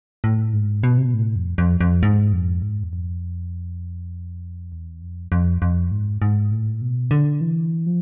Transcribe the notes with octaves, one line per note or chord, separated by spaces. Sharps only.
A2
G#2
B2
C3
B2
A2
F2
F2
F2
G#2
F2
G#2
E2
F2
E2
F2
F2
F2
G#2
G#2
A2
B2
D3
E3
F3